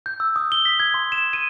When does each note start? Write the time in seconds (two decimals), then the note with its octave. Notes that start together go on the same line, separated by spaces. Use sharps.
0.06 G6
0.20 E6
0.36 D#6
0.52 G7
0.65 B6
0.80 G#6
0.94 C6
1.12 E7
1.33 D#7